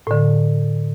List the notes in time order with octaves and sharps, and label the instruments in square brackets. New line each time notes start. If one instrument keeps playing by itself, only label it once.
[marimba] A2 D3